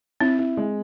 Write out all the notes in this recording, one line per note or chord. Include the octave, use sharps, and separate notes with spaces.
C4 E4
E4
G#3